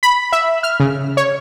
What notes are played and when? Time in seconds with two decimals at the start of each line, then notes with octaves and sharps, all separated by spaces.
0.03 B5
0.32 E5
0.63 F6
0.80 C#3
1.17 C#5